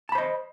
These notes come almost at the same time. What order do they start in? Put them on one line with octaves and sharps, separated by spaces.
A5 B5 C5 D#5